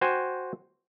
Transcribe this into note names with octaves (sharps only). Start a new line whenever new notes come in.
F#4 C5 G5 G#5